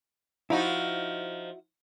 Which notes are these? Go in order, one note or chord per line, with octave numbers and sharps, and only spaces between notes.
F3 D#4 E4 F#4